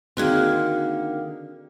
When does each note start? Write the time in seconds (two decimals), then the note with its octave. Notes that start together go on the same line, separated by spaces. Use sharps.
0.17 D3 D#3 A#3 C4 F#4 G#4